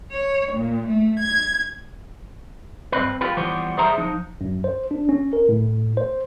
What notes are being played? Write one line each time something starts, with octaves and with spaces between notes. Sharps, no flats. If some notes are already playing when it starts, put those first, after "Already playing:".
C#5
A#2
A3
G#6
G2 C4 B4
F4 G4 B4
E3 F3 G3 B3 C5 C#5
B1 G3 G#4 C5 E5 A#5
F3 D#4
F#2
C5
D4
C#4
A#4
A2
C5